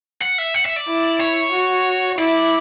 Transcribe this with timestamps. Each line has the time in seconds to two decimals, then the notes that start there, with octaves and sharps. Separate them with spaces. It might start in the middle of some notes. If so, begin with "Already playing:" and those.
0.21 F#5
0.38 E5
0.54 F#5
0.65 E5
0.76 D5
0.88 E4
1.20 C#5
1.53 F#4
2.18 E4 D5